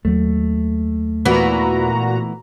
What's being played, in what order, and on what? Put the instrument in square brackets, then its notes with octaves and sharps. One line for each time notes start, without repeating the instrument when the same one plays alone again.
[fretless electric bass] D#2 F#3 [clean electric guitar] A3
[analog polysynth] A#2 F#4 A#5 [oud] E3 B3